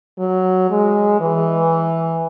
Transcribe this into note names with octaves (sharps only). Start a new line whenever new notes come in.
F#3
G#3
E3